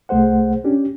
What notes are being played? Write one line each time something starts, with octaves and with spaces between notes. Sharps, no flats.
C2 A3 G#4 C5 F#5
C#4 D4 G4